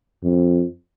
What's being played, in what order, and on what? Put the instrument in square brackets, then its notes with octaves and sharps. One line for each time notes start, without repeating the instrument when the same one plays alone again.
[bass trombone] F2